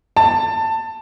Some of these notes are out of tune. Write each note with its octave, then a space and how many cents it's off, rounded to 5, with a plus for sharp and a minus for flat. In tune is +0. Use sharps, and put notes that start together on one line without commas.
A5 +15